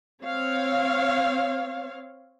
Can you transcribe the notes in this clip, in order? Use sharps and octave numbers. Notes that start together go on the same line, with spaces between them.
C4 C#5 F5